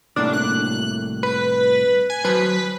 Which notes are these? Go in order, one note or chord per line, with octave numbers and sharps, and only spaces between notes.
C2 A2 A#3 D4
F#6
B4
G#5
F#3 B4 C5 A5